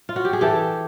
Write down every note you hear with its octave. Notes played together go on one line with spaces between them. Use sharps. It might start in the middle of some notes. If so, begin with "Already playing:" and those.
F4
F#4
G4
G#4
E3 G4 A4